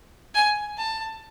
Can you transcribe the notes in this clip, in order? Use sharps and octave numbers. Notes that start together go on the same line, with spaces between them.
G#5
A5